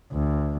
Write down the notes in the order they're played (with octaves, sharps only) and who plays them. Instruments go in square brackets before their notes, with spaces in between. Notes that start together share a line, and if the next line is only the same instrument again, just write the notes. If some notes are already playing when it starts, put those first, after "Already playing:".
[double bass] D2